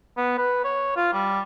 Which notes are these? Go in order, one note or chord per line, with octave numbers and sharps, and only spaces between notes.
B3
B4
C#5
F4
G3